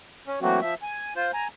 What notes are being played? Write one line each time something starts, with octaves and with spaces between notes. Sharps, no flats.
C#4
E3 F#3 A3 A#3 C4 F#4
F3 E5
G#5
F4 C5
G#5 A#5